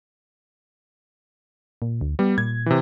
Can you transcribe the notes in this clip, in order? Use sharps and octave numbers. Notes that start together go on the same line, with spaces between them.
A#2
D2
G3 B3
A#2 G#6
C3 E3